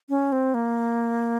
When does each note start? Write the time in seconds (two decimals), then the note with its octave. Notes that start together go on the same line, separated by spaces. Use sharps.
0.09 C#4
0.32 C4
0.54 A#3